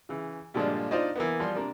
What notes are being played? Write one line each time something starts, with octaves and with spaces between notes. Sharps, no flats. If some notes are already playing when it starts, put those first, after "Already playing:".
C#3 E3
G2 A#2 D3 F3 G#3 D4
D4 D#4 F4 C5 D5 D#5
E3 A#3 B3
F3 G3 C6
C3 A#3 D4 A#4